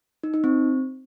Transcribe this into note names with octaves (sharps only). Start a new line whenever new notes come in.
D#4
D#4
C4